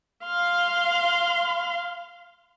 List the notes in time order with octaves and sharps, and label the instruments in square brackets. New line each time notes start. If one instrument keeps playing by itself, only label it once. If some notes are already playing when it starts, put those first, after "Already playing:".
[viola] F5 C6